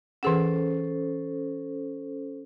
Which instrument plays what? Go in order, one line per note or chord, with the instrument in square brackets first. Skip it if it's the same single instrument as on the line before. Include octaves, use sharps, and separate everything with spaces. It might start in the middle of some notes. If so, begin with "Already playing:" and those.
[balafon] E3 G#4 F#5 [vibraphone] C#4 A4 C5